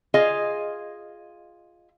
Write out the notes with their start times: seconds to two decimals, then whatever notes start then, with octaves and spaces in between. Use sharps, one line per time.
0.14 F4 G#4 D#5 F5